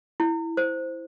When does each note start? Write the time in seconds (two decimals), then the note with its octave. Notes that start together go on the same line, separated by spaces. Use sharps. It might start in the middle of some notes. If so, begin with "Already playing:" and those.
0.20 E4
0.57 C5